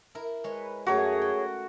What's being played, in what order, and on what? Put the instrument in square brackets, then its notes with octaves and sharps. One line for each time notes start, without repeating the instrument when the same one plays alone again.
[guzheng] E4 A#4
[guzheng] G#3 C#5 [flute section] B4
[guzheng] F#2 A3 A#4 [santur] F#4 [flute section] G#4 C#5
[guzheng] G5